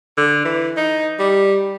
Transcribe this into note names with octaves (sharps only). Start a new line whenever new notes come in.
D3
E3
D#4
G3